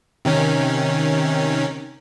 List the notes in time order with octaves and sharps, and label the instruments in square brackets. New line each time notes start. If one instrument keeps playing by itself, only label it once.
[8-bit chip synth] C3 D#3 C#4